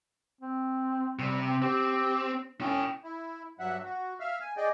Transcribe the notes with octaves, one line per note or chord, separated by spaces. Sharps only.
C4
C3 G3
C4
C4 G4
C#4 E4 G5
E4
G2 F#3 E5 F#5
F#4
E5 F5
G#5
G#4 D5 D#5 G5